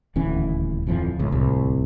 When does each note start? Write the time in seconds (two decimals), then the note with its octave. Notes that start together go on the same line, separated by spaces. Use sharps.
0.16 D#1 D2 E3 C#4
0.87 D1 F2 E3 F3
1.19 C#2 A2
1.32 D1 C2 A2